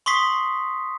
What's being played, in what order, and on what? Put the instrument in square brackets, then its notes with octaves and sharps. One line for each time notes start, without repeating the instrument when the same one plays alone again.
[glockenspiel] C6 C#6 D#6 B6 C7